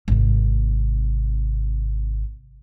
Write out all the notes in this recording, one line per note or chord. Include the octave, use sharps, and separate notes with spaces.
G#1 C3